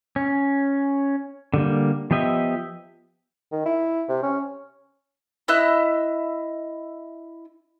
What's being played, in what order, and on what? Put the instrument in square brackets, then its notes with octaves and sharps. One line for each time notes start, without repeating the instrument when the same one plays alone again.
[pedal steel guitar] C#4
D3 G3 A#3
F3 B3 G4 D#5 E5
[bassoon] D#3
E4
C3
C#4
[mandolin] E4 D#5 E5 F#6